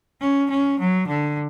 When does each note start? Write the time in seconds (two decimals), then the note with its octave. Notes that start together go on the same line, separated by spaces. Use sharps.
0.21 C#4
0.50 C#4
0.80 F#3
1.08 D3